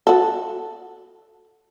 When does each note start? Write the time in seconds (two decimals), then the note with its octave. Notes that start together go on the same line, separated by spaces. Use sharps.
0.07 F#4 A4